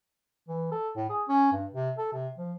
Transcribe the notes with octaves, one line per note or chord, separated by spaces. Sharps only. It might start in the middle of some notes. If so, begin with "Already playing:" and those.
E3
A4
A2
G#4
C#4
G2
C3
A4
C3
F3